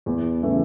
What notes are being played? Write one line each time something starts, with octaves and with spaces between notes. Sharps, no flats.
E2
C#3 E3 A3